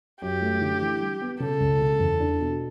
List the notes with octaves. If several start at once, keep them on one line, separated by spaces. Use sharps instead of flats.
F#2 G4
A3
D3
E3
G3
B3
C#3 A4
C#2
C#3
E2
D4
B2